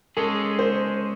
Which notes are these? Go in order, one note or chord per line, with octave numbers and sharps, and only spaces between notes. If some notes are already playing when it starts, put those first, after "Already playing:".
G#3 C#4 G#4 A4
C5